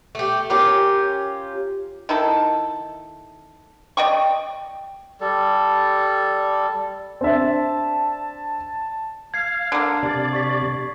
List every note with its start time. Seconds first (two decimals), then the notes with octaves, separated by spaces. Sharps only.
0.15 A3 G4
0.50 C#4 F4 G4 A#4
2.09 D#3 E4 A4
3.97 D5 D#5 G5 C#6
5.21 G3 A4
7.21 C4 D4 E5 A5
9.34 F5 G#6 C7
9.72 D3 A#3
10.03 C3 D5
10.33 C#6 B6